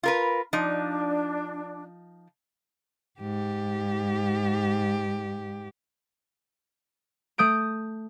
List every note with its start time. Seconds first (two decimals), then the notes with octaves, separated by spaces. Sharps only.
0.03 F4 A#4 B4
0.53 F3 D4 D#4
3.20 G#2 G4
7.38 A3 D#6 G6 D7